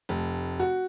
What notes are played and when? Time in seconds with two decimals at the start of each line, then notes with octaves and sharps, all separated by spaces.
0.09 F1
0.60 F#4